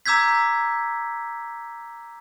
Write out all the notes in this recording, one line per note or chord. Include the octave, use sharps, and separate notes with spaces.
A#5 D6 E6 G6 G#6 B6